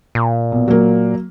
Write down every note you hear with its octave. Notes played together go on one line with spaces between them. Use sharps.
A#2
B1
F#3 A#3